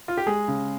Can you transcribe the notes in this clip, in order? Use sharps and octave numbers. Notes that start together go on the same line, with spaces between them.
F4
G4
G#3 G#4
C#3